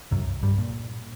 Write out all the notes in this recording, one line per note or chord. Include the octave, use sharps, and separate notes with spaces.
C2 F#2 F#3
G2 G3
A#2